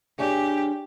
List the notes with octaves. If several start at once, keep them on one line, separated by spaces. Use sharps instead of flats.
D4 G4 G#4 C#5